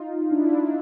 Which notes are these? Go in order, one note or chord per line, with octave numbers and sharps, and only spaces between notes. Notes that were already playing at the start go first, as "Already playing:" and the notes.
Already playing: D#4 F4
D4 E4
D4 E4